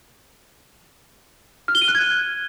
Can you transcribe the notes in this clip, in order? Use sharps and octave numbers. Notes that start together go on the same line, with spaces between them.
F6
G7
D#7
F#6
G#6